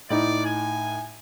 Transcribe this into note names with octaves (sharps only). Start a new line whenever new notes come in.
A2 D#4 D5
G#5